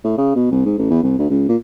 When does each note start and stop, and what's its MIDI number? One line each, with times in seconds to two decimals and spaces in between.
0.04 0.17 45
0.18 0.31 49
0.36 0.47 47
0.51 0.61 36
0.65 0.77 44
0.78 0.86 33
0.90 1.01 40
1.03 1.17 36
1.19 1.26 38
1.30 1.44 37
1.49 1.56 46